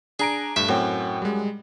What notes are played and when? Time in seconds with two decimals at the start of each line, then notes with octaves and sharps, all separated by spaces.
0.19 D4 G#4 A#5 D7
0.56 G2 A3 E5
0.69 F#2 A2 C4 G5
1.22 G3 G#3